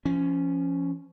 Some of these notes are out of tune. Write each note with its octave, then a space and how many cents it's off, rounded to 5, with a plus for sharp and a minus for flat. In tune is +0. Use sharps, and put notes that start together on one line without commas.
F3 -25 C#4 +0